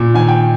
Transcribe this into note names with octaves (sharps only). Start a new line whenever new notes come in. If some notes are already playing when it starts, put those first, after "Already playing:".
Already playing: A#2
D#3 G#5
G5